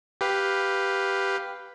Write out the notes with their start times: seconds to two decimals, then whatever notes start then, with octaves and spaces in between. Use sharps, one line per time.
0.21 G4 B4 F5